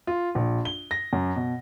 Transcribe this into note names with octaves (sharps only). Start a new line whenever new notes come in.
F4
A#1
G7
A#6
F#2
B2